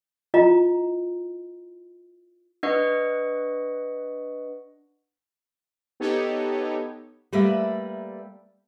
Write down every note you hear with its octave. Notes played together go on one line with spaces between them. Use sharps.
E4 F4 D#5 A#5
D4 B4 D#5 F#5 C#6
B3 D#4 G4 A4 C#5
G3 A3 A#3 B4 D5 E5